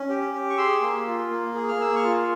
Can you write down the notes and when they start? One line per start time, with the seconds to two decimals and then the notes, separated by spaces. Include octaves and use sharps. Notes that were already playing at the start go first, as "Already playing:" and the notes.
Already playing: C#4
0.09 G4
0.34 G4
0.50 C#6
0.58 G#4 C6 E6
0.81 A#3
1.06 F4
1.30 A#3
1.55 G#4
1.69 F6
1.79 A#3 E6
1.96 C#6 F6
2.03 F4